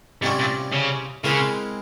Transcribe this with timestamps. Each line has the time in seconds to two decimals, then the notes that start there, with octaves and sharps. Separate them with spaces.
0.22 G#2 C3 G3 C#4 E4
0.39 A#2
0.73 C#3
1.24 C#3 G#3 C4 E4 A#4